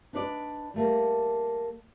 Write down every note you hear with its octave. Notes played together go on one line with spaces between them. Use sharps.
D4 D#4 B4 C#5 D5
G3 A3 A#3